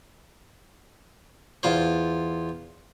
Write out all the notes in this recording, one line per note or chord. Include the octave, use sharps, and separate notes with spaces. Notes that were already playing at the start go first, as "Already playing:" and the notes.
E2 F4 C5